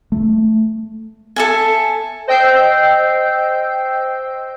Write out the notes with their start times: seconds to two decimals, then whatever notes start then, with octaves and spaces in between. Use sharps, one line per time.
0.12 A3
1.36 A4 E5 G#5
2.28 C5 D#5 G5 E6 G6 C7